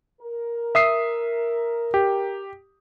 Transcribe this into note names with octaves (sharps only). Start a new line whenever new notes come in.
A#4
E5 D#6 C7
G4